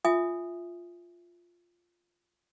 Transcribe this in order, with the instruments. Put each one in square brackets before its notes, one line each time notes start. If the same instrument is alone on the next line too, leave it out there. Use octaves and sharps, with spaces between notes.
[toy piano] F4 E5 G#5 D#6